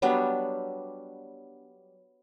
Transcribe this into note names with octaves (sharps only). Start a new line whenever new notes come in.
F#3 G3 B3 D4